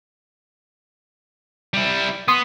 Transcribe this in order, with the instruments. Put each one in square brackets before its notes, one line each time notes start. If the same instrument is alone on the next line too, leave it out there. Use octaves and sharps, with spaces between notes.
[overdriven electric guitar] G3 E4
[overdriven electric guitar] B3 [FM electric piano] C6 D#6